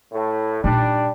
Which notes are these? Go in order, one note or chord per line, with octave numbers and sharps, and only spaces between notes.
A2
A#2 G3 D4 D#4